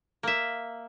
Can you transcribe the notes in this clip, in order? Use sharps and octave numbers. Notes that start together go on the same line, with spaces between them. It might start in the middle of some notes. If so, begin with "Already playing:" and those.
A#3 E5